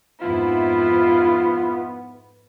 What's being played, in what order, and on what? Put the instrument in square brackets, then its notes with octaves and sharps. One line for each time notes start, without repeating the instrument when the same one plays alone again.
[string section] F2 G#2 E4 [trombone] B3 [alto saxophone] F4